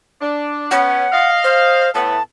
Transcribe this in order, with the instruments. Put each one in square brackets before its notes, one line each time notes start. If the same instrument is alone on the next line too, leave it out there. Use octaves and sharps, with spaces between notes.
[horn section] D4
[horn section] B3 C#4 [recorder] F#5
[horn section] D#5 F5
[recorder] C5
[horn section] A2 B3 [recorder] A5